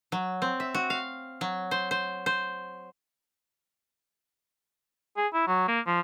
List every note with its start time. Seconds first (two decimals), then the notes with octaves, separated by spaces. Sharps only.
0.12 F#3
0.42 C4
0.60 E5
0.74 F#4
0.90 F5
1.41 F#3
1.71 C5
1.91 C5
2.26 C5
5.17 G#4
5.34 E4
5.48 F#3
5.68 A#3
5.86 F3